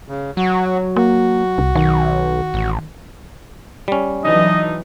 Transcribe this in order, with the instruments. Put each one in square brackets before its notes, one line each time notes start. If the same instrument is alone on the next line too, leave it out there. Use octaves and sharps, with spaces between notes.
[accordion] C#3
[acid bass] F#3 [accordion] F#4
[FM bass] A#3 [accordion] F#4
[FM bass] C2
[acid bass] B1 [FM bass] D#3
[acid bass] A1
[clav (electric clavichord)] G3 C#4
[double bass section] E3 F#3 [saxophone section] A3 D4 D#4 [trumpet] D#5